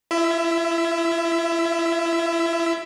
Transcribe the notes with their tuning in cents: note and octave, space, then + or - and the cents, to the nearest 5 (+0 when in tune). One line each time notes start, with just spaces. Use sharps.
E4 +40 E5 +0